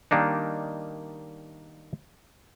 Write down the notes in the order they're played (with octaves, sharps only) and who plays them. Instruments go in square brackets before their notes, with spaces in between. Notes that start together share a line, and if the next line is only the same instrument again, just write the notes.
[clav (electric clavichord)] D#3 G3 A#3 D4 D#4